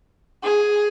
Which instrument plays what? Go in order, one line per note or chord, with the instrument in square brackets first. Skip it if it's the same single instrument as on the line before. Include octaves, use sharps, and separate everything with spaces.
[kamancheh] G#4